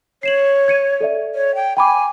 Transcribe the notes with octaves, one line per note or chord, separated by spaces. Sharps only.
C#5 C7 E7 F#7
G#6 C#7 D#7
A4 D5 E5
C#5
G5
G5 G#5 B5 D6